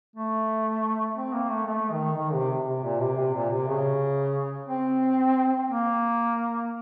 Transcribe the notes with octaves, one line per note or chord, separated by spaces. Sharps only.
A3
C4
A#3
A3
A3
D#3
D#3
C3
C3
A#2
C3
C3
A#2
C3
C#3
C4
A#3